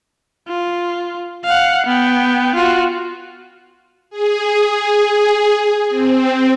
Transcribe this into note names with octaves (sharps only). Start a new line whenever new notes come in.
F4
F5 F#5
B3 G5
F4 F#4
G#4
C4